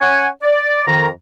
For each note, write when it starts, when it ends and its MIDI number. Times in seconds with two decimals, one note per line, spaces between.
0.01 0.27 61
0.01 0.27 78
0.01 0.27 80
0.43 0.86 74
0.87 1.08 41
0.87 1.08 51
0.87 1.08 82